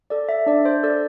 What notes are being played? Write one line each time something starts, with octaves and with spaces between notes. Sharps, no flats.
A4 D5
E5
D4 D5
C5
A4 D5